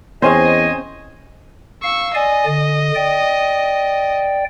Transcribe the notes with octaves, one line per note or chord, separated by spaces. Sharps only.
E2 C4 C#4 C5 D#5 F5 G#5
F5 C#6 E6
D5 D#5 G#5
D3
D5 G5